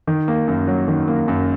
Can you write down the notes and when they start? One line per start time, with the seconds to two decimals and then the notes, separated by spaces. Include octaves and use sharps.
0.07 D#3
0.28 A#3
0.48 F#2
0.67 F#3
0.88 D#3
1.08 A#3
1.28 F#2